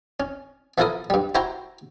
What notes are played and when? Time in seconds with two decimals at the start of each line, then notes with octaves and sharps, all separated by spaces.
0.20 C#4
0.78 E3 F3 E4 A4 A#4 D#6
1.10 G2 G3
1.35 E4 F#4 C5 G5 A#5 C6